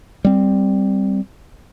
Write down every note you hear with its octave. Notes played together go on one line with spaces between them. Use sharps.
G3 C4